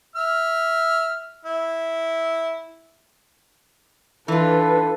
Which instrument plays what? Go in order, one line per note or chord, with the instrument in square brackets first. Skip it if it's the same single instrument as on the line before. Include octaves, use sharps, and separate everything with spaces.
[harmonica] E5 F6
E4
[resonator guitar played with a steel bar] E3 F4 [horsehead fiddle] D4 B4 [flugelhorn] A4